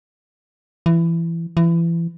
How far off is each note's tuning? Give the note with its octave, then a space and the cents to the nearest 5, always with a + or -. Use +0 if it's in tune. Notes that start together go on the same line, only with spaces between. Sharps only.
E3 +20
E3 +30